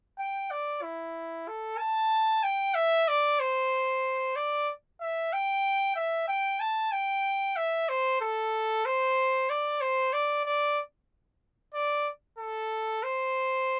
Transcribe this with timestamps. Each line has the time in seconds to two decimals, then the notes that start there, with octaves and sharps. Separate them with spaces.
0.19 G5
0.51 D5
0.82 E4
1.48 A4
1.78 A5
2.43 G5
2.75 E5
3.08 D5
3.39 C5
4.36 D5
5.01 E5
5.33 G5
5.96 E5
6.28 G5
6.60 A5
6.92 G5
7.57 E5
7.89 C5
8.21 A4
8.86 C5
9.50 D5
9.81 C5
10.13 D5
10.45 D5
11.74 D5
12.38 A4
13.03 C5